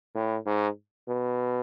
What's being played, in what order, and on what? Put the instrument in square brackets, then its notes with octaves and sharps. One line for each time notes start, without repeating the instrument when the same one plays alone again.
[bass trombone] A2
G#2
B2